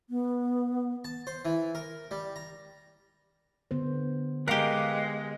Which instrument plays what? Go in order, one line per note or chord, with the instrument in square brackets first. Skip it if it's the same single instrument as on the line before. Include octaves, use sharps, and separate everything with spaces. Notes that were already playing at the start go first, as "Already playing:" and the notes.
[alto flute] B3
[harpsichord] A5
C5
E3
A#4
G3
A#5
[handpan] D3 B3 C5
[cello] G#3 [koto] G4 A#4 [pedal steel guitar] B4 F5 D6